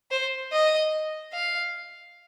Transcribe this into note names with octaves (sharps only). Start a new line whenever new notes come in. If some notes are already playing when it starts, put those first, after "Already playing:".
C5
D#5
F5